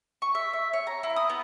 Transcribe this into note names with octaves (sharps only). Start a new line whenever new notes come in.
C#6
E5
E5
C#5
A#5
E4
D#6
B3